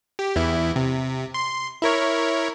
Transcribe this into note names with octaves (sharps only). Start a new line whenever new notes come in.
G4
E2 E4
C3
C6
E4 A#4 C#5